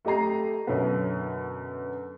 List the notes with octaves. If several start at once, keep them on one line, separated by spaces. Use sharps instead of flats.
A3 G4 D#5 A#5 C7
F#2 B2 D3 B3